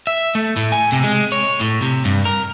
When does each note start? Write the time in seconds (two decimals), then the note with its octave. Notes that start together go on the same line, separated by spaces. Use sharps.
0.07 E5
0.35 A3
0.56 A2
0.72 G#5
0.92 C3
1.04 G#3
1.32 C#5
1.60 A2
1.82 C3
2.05 G2
2.25 A#4